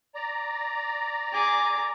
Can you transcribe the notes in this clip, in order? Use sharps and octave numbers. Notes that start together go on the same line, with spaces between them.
D5 A#5
G#4 D6